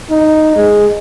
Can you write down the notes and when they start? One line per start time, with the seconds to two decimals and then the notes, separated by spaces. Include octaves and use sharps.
0.11 D#4
0.56 G#3